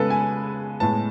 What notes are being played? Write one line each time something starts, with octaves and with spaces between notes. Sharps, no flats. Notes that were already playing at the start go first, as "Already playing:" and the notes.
Already playing: C#3 G#3 B3 A4 B4
G#5
A2 G#3 B3 A5